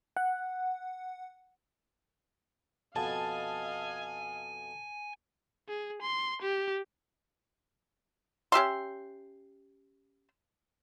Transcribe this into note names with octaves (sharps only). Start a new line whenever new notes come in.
F#5
F2 B2 D#5 F5 G#5 A5
G#4
C6
G4
C#4 G4 E5 C6